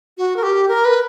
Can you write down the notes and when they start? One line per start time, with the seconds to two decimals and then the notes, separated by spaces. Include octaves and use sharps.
0.18 F#4
0.36 A#4
0.43 G4
0.68 A#4
0.85 B4